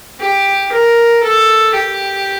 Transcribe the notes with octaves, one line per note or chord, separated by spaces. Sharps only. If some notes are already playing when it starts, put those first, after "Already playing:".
G4
A#4
A4
G4